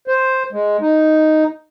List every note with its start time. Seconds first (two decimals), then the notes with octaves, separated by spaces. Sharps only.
0.08 C5
0.53 G#3
0.82 D#4